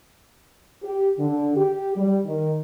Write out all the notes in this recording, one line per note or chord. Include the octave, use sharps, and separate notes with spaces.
G4
D3
G4
G3
D#3